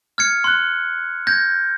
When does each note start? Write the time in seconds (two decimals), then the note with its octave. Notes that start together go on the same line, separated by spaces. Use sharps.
0.18 F6 G#6 C#7
0.44 C6 F#6
1.27 G6 G#6 A#6